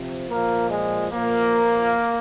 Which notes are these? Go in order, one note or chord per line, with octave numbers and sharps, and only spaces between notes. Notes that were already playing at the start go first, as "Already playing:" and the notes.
Already playing: C3 F3
A#2 F3 A#3
G#3
A#2 F3 A#3